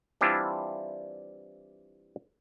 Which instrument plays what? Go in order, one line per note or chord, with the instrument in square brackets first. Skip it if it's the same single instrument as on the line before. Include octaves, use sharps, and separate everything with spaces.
[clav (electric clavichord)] E3 G3 C4 D4 E4 F4